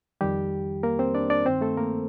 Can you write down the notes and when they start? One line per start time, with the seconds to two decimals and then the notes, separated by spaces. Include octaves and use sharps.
0.21 F2 D#3 G3 G4
0.83 A#3 A#4
0.99 C4 C5
1.15 D4 D5
1.30 D4 D5
1.46 G2 D#3 C4 C5
1.61 A3 A4
1.77 A#3 A#4